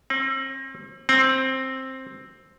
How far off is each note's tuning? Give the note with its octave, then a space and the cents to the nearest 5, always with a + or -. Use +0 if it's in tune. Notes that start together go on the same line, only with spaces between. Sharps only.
C4 +40
C4 +10